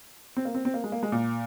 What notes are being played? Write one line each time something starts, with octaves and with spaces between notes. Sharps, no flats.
C4
A#3
C4
C4
A#3
G#3
A#3
G#3
A#2